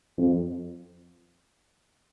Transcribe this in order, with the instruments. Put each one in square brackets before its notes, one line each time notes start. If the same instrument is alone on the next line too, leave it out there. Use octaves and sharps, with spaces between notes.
[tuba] F2